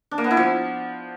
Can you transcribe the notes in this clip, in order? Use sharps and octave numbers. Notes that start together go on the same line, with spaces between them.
D4
A#3
B3
E4
F3